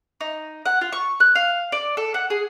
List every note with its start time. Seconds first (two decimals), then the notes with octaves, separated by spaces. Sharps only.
0.21 D#4
0.65 F#5
0.81 F4
0.92 C#6
1.20 F#6
1.35 F5
1.72 D5
1.97 A4
2.14 F#5
2.30 G#4